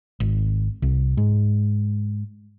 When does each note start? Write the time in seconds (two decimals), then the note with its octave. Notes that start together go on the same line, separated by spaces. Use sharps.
0.20 G#1
0.82 C2
1.17 G#2